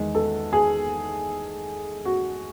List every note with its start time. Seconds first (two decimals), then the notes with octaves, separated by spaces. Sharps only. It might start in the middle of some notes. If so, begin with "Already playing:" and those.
Already playing: E2 D#3 G#3
0.15 A4
0.53 G#4
2.05 F#4